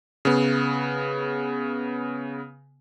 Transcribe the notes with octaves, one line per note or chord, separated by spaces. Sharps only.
C#3 B3